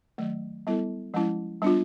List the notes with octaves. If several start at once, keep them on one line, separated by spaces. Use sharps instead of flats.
D#3 F#3 A3
G3 B3 E4 A4
F3 G#3 C#4 E4
G3 B3 D4 F4